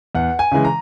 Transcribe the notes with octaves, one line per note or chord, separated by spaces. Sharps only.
E2 F#5
G#5
C#3 E3 G#3
A#5